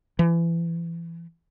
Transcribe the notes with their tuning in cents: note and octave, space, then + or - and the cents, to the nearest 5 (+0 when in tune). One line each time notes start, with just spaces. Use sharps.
E3 +30